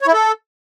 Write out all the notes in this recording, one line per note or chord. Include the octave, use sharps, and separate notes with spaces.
C#5
E4
A4